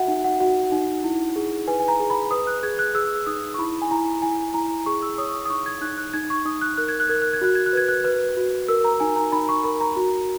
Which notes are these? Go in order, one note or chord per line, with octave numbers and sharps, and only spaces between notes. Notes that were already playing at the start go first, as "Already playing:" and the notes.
Already playing: F#4 E5 F#5
D#4
F#5
F#4 F#5
D#4
E4
G#4
B4 G#5
G#5
A#5
G#4
B5
B4 D#6
F#6
G#4 G#6
F#6
G#4 E6
D#4 D#6
C#6
E4 B5
G#5
E4 A#5
E4 G#5
E4 A#5
G#4 C#6
E6
C#5 D#6
C#6
D#6
D#6
D#4 C#6
G#6
D#4 F#6
F#6
D#4 G#6
C#6
D#4 D#6
F#6
A#4 F#6
G#6
F#6
A#4 G#6
F#6
G#6
F#4 F#6
G#6
F#6
B4 G#6
F#6
B4
F#4
A#4 E6
A#5
D#4 G#5
A#5
D#4 B5
C#6
A#4 B5
A#5
F#4